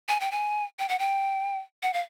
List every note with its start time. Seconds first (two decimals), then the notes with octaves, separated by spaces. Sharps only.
0.09 G#5
0.20 G5
0.31 G#5
0.79 G5
0.89 F#5
0.99 G5
1.83 F#5
1.93 F5